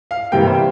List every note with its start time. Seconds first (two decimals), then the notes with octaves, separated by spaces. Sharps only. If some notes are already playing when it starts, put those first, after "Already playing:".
0.11 F5
0.32 C3 E3 G3 A#3 G5
0.47 C5